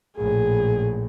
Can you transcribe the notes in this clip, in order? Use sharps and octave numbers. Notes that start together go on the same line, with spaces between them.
A#1 A2 G#4